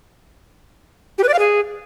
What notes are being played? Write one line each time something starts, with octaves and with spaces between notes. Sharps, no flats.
G4
B4
D5
F5
G#4